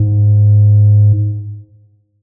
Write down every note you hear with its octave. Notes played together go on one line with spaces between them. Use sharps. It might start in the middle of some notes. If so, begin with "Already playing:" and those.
Already playing: G#2